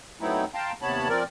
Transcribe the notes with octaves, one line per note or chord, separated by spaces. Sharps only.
F#3 A3 B3 C4 D#4 E4
F5 G5 A5 A#5 C6
D#2 C3 B3 C#5 A5 B5
F3 C4 A#4 D5